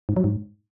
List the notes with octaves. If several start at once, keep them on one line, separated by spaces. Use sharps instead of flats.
G#2
F#3
G#2